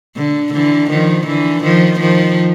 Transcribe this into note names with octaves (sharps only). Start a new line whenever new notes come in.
D3
D3 E3
D#3 F3
D3 E3
D#3 F3
D#3 F3